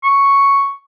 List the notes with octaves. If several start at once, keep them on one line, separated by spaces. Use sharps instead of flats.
C#6